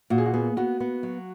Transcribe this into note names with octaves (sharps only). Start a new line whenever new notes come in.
A#2 F#4
G#4
F#4
B3 G#4
B3 F#4
B3
F#3